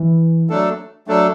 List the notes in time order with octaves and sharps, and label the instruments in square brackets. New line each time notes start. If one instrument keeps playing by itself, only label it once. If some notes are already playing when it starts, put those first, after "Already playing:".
Already playing: [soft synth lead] E3
[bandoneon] F#3 A3 D4 A4
F#3 A3 D4 A4